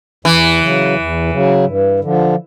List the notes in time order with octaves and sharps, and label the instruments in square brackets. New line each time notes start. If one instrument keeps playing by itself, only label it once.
[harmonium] E2 [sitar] E3
[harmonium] C#3 F#3
E2
C#3 F#3
G2
D3 F3